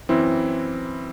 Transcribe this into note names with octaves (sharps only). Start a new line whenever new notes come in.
F#2 E3 C4 E4